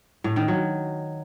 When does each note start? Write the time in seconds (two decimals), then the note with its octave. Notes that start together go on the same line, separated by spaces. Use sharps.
0.24 A2
0.36 D#3
0.48 F#3